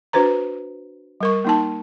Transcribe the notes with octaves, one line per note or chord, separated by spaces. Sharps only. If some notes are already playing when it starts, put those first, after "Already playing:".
D4 F#4 B4 C5 A#5
G3 A#4 C#6
A#3 D#4 A5